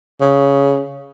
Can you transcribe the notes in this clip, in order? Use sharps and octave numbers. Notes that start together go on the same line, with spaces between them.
C#3